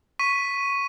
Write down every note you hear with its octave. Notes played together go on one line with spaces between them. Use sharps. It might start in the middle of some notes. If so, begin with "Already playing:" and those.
C#6 B6 D#7